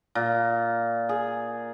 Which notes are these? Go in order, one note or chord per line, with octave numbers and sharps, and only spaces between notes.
A#2
G#4